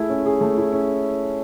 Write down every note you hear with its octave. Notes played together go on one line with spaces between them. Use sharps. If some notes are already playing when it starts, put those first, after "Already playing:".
Already playing: A3 E4 G#4
C#4
G#4
A3
E4
C#4